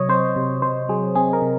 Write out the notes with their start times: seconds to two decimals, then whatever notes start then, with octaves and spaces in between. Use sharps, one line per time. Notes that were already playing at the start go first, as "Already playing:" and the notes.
Already playing: C3 F#3 C#5 D#5
0.09 C4 C5
0.36 C3
0.62 C3 C5
0.89 F#3 G#4
1.15 C4 G#4
1.33 A#4
1.42 C3